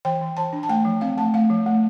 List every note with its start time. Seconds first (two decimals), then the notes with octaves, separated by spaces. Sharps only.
0.05 E3 G5
0.21 E3
0.37 E3 A5
0.53 D4
0.63 A5
0.69 A3 G5
0.85 F3
1.01 C4 F5
1.18 A3 A5
1.34 A3 F5
1.50 F3
1.66 A3